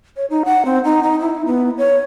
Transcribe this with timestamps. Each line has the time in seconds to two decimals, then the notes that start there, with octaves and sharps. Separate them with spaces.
0.17 C#5
0.30 D#4
0.45 F#5
0.65 C4
0.84 D#4
1.03 D#4
1.20 E4
1.46 B3
1.78 C#5